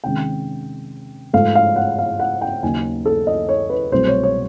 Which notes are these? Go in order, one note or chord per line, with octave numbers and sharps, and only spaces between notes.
C3 D#3 G#3 C#4 G5
G#2 F3 A3 F5
F5
F#5
F5
F#5
G5
D#2 C#3 F#3 A#3 D#4 G#5
A4
D#5
C#5
B4
C2 B2 F#3 A3 C4 C5
C#5
C#5